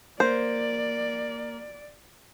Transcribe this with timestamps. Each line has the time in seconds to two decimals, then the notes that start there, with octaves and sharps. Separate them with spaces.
0.20 A#3 C5 D5